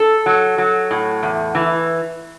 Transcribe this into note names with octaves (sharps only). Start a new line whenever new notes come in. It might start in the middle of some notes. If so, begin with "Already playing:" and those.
Already playing: A4
F#3
F#3
A2
E2
E3